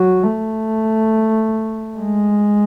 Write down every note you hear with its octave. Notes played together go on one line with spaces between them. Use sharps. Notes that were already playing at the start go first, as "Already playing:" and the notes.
Already playing: F#3
A3
G#3